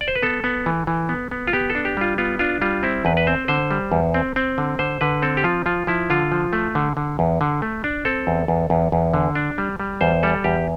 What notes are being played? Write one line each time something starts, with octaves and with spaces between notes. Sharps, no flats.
D5
C5
B4
B3 A4
B3
E3
E3
B3
B3
F4
B3 G4
A4
D4
G4
G3 F4
B3 F4
D4 F4
G3 F4
C4 E4
E2 B4
B4
C4 C5
D3 C5
G3
E2
C4
C4
D3
D3 C5
D3 B4
C4 A4
G4
F3 F4
F3 F4
F3 E4
D3 F4
F3
A3
D3
D3
E2
D3
A3
D4
C4 A4
E2
E2
E2
E2
D3
D4
G3
G3
E2 C5
G3 A4
E2 G4